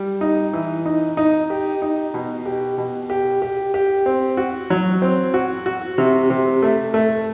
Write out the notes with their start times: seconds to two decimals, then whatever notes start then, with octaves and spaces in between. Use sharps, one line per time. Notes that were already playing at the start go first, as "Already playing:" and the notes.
Already playing: G3
0.21 D#4
0.53 E3
0.86 D#4
1.17 D#4
1.50 G4
1.82 D#4
2.14 B2
2.46 G4
2.78 B2
3.10 G4
3.42 G4
3.74 G4
4.06 C4
4.37 F#4
4.70 F#3
5.02 C4
5.34 F#4
5.66 F#4
5.98 C3
6.30 C3
6.62 A3
6.94 A3